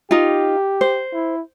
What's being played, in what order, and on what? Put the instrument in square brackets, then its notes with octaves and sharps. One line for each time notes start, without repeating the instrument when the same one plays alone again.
[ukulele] D#4 F4 [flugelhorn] G4
[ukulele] C5
[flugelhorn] E4